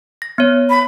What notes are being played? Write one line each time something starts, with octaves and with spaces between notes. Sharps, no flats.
A#6
B3 C#5
B5